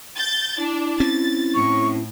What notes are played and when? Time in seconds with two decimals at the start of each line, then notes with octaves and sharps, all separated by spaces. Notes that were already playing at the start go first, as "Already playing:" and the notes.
0.16 G6 A6
0.57 D4 E4
1.00 C4 C#4 A6
1.55 A2 C#6